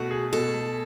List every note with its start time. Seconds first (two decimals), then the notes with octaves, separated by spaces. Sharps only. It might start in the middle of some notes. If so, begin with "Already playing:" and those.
Already playing: B2 A3 F#4
0.11 G#4
0.32 B2 A4
0.54 A3